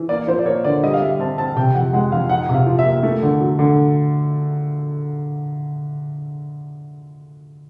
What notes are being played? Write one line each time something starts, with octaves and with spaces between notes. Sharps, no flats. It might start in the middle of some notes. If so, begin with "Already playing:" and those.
Already playing: E3
A#3 D5
F3 C5
D5
A#3 C#5
D3 D5
G3 D#5
F5
G3 E5
C4 A5
C4 A5
C3 G5
F2 F#5
G#3 F#5
F2 F5
D#4 F#5
C3
F5
F3
E5
A#3
A3
D3
F#3
D3